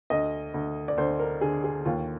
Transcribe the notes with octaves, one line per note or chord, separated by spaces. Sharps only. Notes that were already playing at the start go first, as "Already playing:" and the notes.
D2 D#5
D2
D5
D2 C5
A#4
D3 G#4
G#4
D#2 F4